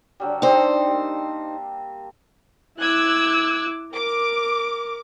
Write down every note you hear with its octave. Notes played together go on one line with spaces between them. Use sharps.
D3 F#3 G3
G3 C4 D4 D#4 C5
A#3 G4
E4 D6 E6 F#6 G#6
A#4 D6